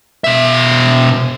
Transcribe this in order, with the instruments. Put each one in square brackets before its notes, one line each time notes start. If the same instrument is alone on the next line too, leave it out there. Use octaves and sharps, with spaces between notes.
[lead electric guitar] B2 E5